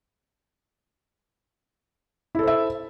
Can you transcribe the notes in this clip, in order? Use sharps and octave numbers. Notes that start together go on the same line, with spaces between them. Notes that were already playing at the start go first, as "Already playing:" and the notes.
E4 A4 C5 E5